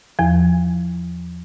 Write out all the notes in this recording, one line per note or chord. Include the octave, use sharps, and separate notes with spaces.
E2 F3